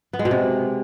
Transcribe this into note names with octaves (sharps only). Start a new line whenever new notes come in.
B3
G#3
B2
C3